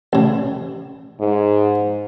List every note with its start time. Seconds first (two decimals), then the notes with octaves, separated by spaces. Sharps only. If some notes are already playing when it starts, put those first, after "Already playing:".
0.13 A1 C#3
1.20 G#2